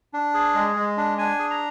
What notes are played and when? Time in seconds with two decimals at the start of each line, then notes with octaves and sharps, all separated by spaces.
0.13 D4
0.34 G#4
0.55 G#3
0.76 G#3
0.97 D4
1.18 D4 G#5
1.39 G#4
1.51 A#5